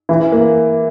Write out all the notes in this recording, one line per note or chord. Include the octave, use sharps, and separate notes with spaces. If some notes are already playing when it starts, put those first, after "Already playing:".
E3
A#3